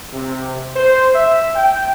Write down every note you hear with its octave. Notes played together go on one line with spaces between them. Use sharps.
C3
C5
E5
G5